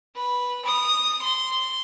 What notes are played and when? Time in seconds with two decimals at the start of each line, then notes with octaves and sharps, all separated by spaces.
0.16 B4
0.66 D#6
1.22 C6